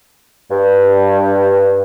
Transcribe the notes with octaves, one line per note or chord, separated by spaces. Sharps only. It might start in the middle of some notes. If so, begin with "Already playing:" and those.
G2